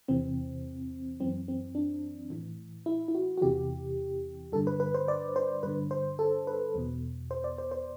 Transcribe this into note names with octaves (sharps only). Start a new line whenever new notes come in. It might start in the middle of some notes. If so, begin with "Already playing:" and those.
E2 C3 E3 C4
F#2 E3 C4
C4
D4
A2 E3
E4
E4
F#4
F#4
E2 C3 E3 G4
G2 D3 A4
B4
B4
C5
D5
C5
G2 D3 B4
C5
A4
B4
E2 B2
C5
D5
C5
C5